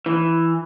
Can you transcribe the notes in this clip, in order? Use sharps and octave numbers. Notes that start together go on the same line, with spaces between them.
E3